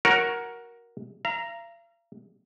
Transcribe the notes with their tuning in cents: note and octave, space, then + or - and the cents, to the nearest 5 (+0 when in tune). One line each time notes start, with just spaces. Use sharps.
F#4 +0 A#4 +10 C#5 +0
F5 -40 A#5 +0